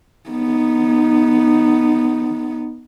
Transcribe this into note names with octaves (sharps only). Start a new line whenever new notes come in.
B3 D#4